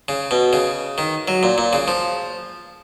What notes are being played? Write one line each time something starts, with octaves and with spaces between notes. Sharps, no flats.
C#3
B2
C#3
D#3
F#3
A#2
A#2
C#3
F3